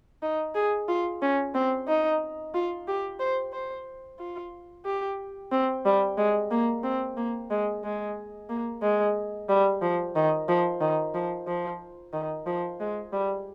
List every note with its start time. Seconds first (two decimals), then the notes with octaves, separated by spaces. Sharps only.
0.22 D#4
0.55 G#4
0.88 F4
1.22 C#4
1.54 C4
1.88 D#4
2.55 F4
2.88 G4
3.20 C5
3.53 C5
4.20 F4
4.86 G4
5.52 C4
5.86 G3
6.17 G#3
6.51 A#3
6.84 C4
7.17 A#3
7.50 G#3
7.84 G#3
8.50 A#3
8.83 G#3
9.49 G3
9.82 F3
10.16 D#3
10.49 F3
10.81 D#3
11.14 F3
11.47 F3
12.13 D#3
12.46 F3
12.80 G#3
13.13 G3